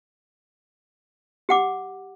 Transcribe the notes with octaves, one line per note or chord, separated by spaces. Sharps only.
G4 F#5 D6